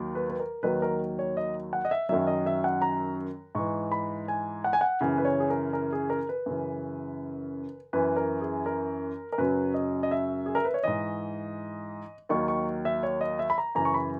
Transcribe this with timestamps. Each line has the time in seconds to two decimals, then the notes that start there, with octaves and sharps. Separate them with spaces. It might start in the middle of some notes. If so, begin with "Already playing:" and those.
Already playing: D#2 D#3 F#3
0.15 B4
0.30 B4
0.40 A#4
0.63 D#2 D#3 F#3 B4
0.82 A#4
1.19 C#5
1.37 D#5
1.73 F#5
1.85 D#5
1.91 E5
2.09 F#2 D#3 F#3 E5
2.27 D#5
2.46 E5
2.64 F#5
2.82 A#5
3.55 G#2 E3 C#6
3.92 B5
4.28 G#5
4.64 F#5
4.73 G#5
4.81 F#5
5.01 F#2 C#3 E3
5.17 B4
5.25 C#5
5.40 G#4
5.50 A#4
5.73 A#4
5.93 G#4
6.10 A#4
6.29 B4
6.46 F#2 C#3 E3
7.93 F#2 E3 B4
8.16 A#4
8.41 G#4
8.66 A#4
9.32 A#4
9.38 F#2 C#3 F#3 B4
9.74 D#5
10.03 D#5
10.11 E5
10.46 G#4
10.55 A#4
10.65 B4
10.74 C#5
10.84 G#2 E3 D#5
12.29 D#2 D#3 F#3 C#6
12.48 C#6
12.85 E5
13.03 C#5
13.21 D#5
13.39 E5
13.50 B5
13.58 A#5
13.75 F#2 C#3 E3 A#5
13.85 C#6
13.94 B5